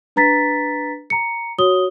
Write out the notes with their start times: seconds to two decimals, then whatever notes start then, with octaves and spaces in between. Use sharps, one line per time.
0.16 D4 B4 A#5 A6 B6
1.10 A#5 C#7
1.58 F#4 C#5 D#6 G7